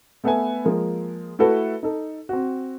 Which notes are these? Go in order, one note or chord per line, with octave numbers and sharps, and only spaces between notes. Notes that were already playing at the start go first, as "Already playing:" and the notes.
A3 B3 A4 B4 E5 G#5
F3 G#3 A#3
A3 E4 F#4 A4 B4
D#4 A4
C4 F#4